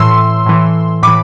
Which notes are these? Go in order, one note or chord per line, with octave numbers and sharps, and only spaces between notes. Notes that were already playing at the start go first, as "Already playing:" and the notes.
Already playing: A2 E3 C6 E6
A2 E3
A2 E3 B5 D6